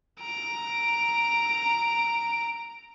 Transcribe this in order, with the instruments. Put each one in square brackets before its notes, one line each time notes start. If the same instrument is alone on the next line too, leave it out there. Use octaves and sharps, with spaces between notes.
[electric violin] A#5 D7